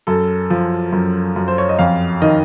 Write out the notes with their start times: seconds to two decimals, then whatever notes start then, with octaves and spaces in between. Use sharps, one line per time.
0.07 F#2 A4
0.50 F3
0.92 F#2
1.36 F#2
1.48 C5
1.58 C#5
1.69 D#5
1.79 F2 F5
2.22 D#3 D#5